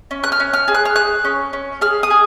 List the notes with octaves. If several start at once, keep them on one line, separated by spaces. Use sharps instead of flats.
C#4
F#6
F6
C#4
F6
G#4
F#6
F6
G#4 F#6
C#4
C#4
G#4 F6
D#6
G#4